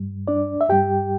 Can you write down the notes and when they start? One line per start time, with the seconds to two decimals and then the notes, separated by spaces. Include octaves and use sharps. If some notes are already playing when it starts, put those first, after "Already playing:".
Already playing: G2 G3
0.28 D4 D5
0.61 E5
0.69 G2 G3 G4 G5